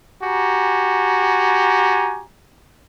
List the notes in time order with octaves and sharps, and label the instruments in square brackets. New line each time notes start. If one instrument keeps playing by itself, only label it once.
[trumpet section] F#4 G4 G#5 A#5